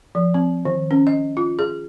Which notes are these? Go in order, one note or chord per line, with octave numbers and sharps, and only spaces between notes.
F3
C4
D#3
C#4
D#5
F4
G#4